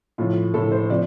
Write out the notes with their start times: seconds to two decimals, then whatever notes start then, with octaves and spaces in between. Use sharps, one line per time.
0.18 A2 F3 F4
0.54 A2 F3 A4
0.71 C5
0.89 C3 F3 D5